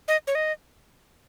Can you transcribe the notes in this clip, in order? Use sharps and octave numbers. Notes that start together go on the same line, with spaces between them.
D#5
C#5
D#5